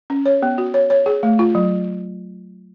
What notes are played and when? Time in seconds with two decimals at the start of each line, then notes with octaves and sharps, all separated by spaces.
0.10 C#4
0.26 C#5
0.43 B3
0.58 F#4
0.74 C#5
0.90 C#5
1.06 G#4
1.23 A3
1.39 F4
1.55 F#3